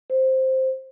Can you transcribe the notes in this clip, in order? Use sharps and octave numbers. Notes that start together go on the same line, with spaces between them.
C5